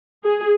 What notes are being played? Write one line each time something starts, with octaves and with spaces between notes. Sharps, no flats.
G#4